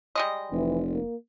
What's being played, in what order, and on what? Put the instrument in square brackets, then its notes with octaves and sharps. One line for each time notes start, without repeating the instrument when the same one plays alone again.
[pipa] G3 G#3 D#5
[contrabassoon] F1 [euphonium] E3
[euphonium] A#3